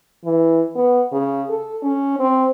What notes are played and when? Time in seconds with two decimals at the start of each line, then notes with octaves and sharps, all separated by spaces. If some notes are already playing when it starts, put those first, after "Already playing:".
0.25 E3
0.75 B3
1.12 C#3
1.50 A4
1.83 C#4
2.19 C4